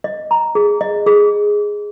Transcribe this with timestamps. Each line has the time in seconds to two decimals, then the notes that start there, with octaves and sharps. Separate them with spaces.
0.04 D#5
0.31 A#5
0.55 G#4
0.81 D#5
1.06 G#4